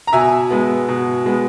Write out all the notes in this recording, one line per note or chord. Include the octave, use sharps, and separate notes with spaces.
A#5
B2 E5 G#5
G#3 B3
B2
G#3 B3